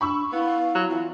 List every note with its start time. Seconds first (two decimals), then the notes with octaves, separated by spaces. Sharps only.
0.01 D4 B5 C#6 E6
0.32 B3 E4 F5
0.75 F#3
0.90 E2 F4